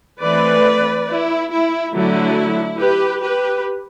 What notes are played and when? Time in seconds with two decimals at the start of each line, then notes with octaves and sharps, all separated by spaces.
0.22 E3 A3 C4 B4 D5
1.08 E4
1.51 E4
1.94 D3 F#3 A3 E4
2.79 G4 B4
3.22 G4 B4